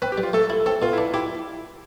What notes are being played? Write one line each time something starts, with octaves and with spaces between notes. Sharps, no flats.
C4 B4
G4
G3
F4
A3 A4
E4
C4 A4
B2 F4
D4 E4
E4 G4